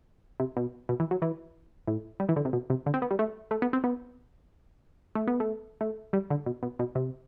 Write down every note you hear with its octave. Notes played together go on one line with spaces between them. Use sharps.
C3
B2
B2
E3
F#3
E3
A2
G3
E3
D3
C3
B2
C3
D3
C4
B3
G3
A3
A3
B3
C4
B3
A3
B3
A3
A3
G3
D3
B2
B2
B2
C3